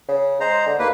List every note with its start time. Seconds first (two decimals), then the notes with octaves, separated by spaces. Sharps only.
0.09 C#3
0.41 G#3 C5 A#5
0.66 D3
0.79 D#2 A#3 B4